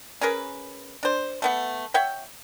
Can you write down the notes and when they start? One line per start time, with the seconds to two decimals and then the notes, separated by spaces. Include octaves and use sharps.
0.21 C#4 G#4 A#4 B4
1.03 D4 C5
1.42 A3 B3 F#5
1.94 C#5 E5 F#5 G5